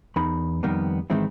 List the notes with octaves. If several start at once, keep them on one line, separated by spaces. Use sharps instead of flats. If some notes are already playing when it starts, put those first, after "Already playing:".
E2 D#4 A#4 B5
F2 D#3 G3 A#3 B3
G#2 D#3 E3 G#3 C4 E4